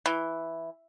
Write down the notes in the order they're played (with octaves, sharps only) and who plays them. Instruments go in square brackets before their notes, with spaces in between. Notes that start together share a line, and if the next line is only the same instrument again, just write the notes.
[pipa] E3